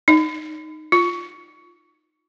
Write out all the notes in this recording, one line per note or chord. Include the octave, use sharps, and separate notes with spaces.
D#4
F4